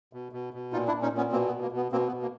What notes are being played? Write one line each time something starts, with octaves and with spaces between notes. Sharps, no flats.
B2
B2
B2
A#2 D#4 F4
D4 E4
A#2
C#4 D#4
A#2 B3 C#4
B2 A#3 C4
B3
B2
A#3
B2 B3
B2 A#3 C4
B3
B2
A#3